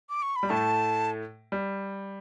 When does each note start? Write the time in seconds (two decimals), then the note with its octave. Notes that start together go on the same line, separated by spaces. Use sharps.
0.09 D6
0.22 C#6
0.36 B5
0.43 G3
0.50 A2 A3 A5
1.52 G3